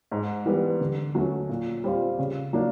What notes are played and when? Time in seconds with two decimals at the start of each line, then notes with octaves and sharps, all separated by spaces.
0.12 G#2
0.45 E3 G3 B3
0.80 D3
1.15 F#3 A3 C#4
1.49 A#2
1.84 G3 C4 F4
2.19 C#3
2.53 F#3 A#3 D4